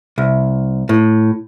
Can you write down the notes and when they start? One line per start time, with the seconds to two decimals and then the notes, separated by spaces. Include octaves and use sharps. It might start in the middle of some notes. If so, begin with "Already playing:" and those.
0.18 C2
0.89 A2